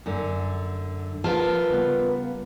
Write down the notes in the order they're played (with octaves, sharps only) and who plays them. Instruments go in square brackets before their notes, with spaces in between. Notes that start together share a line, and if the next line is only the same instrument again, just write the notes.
[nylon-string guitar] F#2 D3
[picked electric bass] F3 [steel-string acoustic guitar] F4 A#4 B4 [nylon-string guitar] A5
[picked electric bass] C#3 G3 B3